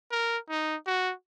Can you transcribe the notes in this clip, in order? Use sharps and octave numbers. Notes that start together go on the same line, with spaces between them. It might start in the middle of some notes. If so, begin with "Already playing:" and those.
A#4
D#4
F#4